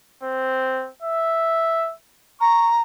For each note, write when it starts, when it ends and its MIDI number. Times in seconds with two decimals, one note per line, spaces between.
0.23 0.89 60
1.02 1.92 76
2.41 2.82 82
2.41 2.67 85